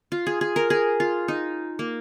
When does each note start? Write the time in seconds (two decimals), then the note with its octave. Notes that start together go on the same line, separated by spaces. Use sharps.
0.12 F4
0.27 G#4
0.41 G#4
0.56 A#4
0.70 G#4
1.00 F4
1.28 D#4
1.79 A#3